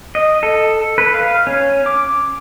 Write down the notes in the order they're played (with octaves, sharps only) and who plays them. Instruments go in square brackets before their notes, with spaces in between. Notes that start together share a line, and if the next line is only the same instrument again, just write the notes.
[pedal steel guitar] D#5
A4
B4
F5
C#4
D6